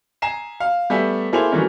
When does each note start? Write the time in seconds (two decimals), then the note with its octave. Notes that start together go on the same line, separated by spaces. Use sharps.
0.22 G#5 A#5 C7 E7
0.60 F5
0.90 G3 A3 B3 E5 G#5
1.33 A#3 E4 G#4 A4 C5 F7
1.52 E3 F#3 G3 A3 A#3 C#4